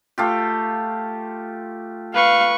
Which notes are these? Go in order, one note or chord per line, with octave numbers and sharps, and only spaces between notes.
A3 F4 G4
B4 F5 C#6